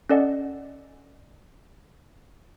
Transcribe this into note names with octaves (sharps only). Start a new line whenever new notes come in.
C#4 A4 D5 D#5 F#5